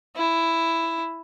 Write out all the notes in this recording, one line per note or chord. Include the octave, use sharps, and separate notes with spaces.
E4